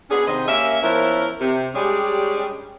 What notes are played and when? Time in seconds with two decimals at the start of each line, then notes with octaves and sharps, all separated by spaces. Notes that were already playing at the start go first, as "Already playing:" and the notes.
0.10 B3 C#4 D4 G#4
0.28 C3 D#3 C5 D#5
0.48 A#3 C#4 G4 A#4 E5
0.83 F3 B3 C#4 E4 A#4
1.40 C3
1.75 G3 G#3 C#4 D4 G4 G#4